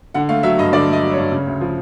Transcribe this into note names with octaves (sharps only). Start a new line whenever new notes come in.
D3 F#5
A3 F5
F#3 E5
G2 D#5
D3 D5
A3
D#5
F#3
C#5
G2
C#3
D2
F3